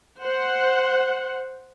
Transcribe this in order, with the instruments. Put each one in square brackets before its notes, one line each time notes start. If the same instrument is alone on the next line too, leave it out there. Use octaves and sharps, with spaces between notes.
[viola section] C5 F#5